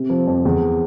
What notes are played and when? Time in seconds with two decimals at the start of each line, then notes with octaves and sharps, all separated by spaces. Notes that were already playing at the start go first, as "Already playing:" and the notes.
Already playing: C3
0.10 F3
0.27 F2
0.45 E2